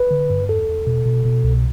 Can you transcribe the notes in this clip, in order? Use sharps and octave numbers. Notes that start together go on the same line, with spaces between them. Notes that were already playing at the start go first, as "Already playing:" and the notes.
Already playing: B4
D3
G2
E2 A4
E2
B2
B2
B2
C2